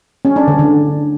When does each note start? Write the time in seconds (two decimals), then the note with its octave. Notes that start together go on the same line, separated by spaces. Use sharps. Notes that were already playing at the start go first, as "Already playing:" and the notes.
0.25 C#4
0.36 D4
0.48 D3
0.59 D3